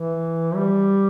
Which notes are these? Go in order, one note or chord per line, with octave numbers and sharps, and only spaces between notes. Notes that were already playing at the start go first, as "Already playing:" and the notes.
Already playing: E3
G3